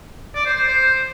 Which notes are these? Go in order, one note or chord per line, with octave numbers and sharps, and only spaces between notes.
D5
C5
C5
C5